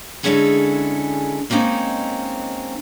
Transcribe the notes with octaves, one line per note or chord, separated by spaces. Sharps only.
D3 G#3 C#4 E4 G#4 A4
G#3 A#3 C4 C#4 D#4